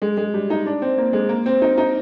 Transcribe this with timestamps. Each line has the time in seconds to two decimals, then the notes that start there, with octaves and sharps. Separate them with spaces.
0.02 G#3
0.17 G#3
0.34 G3
0.50 D#4
0.66 D4
0.82 C4
0.98 A#3
1.13 G#3
1.29 A#3
1.46 C4
1.62 D#4
1.78 D#4